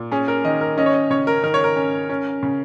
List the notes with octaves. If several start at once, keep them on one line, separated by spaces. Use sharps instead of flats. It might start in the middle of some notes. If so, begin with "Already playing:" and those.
Already playing: A#2
C#4 G#4
A#4
D#3 D#5
A#4
C#4 D#5
C#5
D#5
C#3 C#5
A#4
D#3 A#4
C#5
A#4
C#4
C#4
C#3